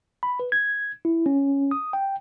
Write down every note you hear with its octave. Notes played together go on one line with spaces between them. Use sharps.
B5
B4
G#6
E4
C#4
D#6
G5